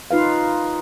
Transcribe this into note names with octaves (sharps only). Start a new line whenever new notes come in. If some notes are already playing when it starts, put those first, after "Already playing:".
D#4 F4 B4 F5